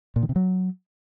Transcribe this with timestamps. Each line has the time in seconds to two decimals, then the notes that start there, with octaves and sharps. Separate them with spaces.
0.16 A#2
0.23 D#3
0.29 C3
0.36 F#3